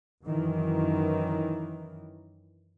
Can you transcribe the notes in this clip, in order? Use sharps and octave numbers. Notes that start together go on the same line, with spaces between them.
F#2 D#3 E3